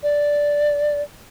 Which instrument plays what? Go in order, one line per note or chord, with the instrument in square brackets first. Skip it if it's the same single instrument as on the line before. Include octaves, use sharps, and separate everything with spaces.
[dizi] D5